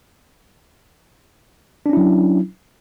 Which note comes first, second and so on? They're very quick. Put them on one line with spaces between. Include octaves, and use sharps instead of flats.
D4 C#4 E4 F#3